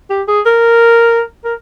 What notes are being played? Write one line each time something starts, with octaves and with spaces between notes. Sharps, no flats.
G4
G#4
A#4
A#4